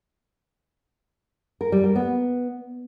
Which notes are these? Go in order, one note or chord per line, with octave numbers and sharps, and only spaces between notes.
A#4
G3
A#4
B3